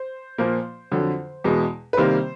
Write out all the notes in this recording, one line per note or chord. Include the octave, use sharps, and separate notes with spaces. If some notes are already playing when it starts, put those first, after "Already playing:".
Already playing: C5
A#2 F3 A#3
F2 D3 F#3
E2 B2 G#3
B4
C3 D#3 G3 A#3 C5